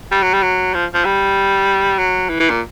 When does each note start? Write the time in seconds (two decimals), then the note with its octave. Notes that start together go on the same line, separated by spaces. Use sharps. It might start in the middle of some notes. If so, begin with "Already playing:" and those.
0.12 G3
0.23 F#3
0.33 G3
0.43 F#3
0.74 F3
0.94 F3
1.05 G3
1.98 F#3
2.29 E3
2.40 E3
2.50 A#2